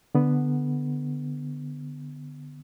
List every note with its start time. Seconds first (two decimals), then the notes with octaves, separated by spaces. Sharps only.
0.15 D3 B3